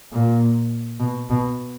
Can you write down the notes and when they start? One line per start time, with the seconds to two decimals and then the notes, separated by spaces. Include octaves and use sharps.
0.12 A#2
1.00 B2
1.30 B2